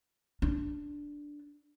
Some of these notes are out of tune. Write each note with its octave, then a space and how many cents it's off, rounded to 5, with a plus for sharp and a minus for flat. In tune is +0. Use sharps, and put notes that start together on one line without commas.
D4 -5